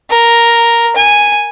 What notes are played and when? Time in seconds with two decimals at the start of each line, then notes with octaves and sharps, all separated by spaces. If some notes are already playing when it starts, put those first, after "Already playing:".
0.10 A#4
0.96 G#5